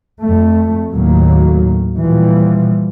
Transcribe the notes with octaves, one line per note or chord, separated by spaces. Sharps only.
F2 A3
D#2 A2 F#3 A#3
A#2 E3 F3 G3